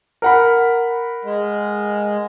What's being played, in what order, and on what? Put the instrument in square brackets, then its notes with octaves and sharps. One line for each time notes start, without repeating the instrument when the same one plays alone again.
[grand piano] A#4 F#5 B5
[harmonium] G#3